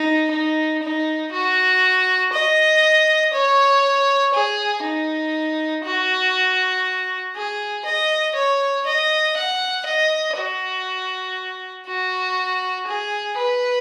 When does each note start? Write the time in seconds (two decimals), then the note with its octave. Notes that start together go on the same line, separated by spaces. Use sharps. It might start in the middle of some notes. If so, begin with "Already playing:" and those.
Already playing: D#4
0.31 D#4
0.83 D#4
1.32 F#4
2.33 D#5
3.34 C#5
4.34 G#4
4.84 D#4
5.84 F#4
7.36 G#4
7.85 D#5
8.35 C#5
8.86 D#5
9.37 F#5
9.86 D#5
10.37 F#4
11.88 F#4
12.87 G#4
13.37 B4